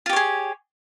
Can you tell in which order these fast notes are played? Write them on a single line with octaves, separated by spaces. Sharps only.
F4 G4 C#5 G#4